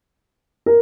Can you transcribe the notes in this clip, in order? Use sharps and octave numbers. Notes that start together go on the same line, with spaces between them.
A#4